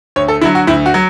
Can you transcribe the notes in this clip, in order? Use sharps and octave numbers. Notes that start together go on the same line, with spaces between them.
D2 C#5
A4
D3 F#3 E4
F#4
D2 E4
F#4
F#3